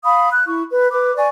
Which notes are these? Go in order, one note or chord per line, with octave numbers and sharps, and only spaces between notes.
F5 B5 D#6
F#6
E4 C#6
B4
B4 D6
D5 G#5 C#6